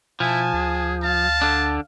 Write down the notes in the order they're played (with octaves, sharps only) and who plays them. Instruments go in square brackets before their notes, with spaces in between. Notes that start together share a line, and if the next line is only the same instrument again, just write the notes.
[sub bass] B2 [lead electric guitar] F3 [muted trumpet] E4 [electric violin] G#5 A5
[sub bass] D2 [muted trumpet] G#4
[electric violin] F5 [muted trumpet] A5
[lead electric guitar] D3 D4